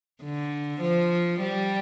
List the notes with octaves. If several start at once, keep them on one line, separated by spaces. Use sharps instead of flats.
D3
F3
G3